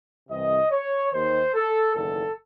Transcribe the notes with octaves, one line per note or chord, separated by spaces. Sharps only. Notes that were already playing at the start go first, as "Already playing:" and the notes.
C2 C3 E3 D#5
C#5
D#2 D#3 C5
A4
F#1 E2 D#3 A4